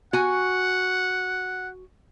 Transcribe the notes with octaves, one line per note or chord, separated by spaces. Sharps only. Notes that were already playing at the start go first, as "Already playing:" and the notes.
F#4 F#5 G#5